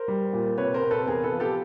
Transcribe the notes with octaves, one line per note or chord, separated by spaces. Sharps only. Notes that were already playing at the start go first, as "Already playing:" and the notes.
Already playing: A#4 C5
G3
A#2
C3 B4 C#5
A#4 C5
C3
A4 B4
E2 G#4 A#4
A4 B4
F3
G4 A4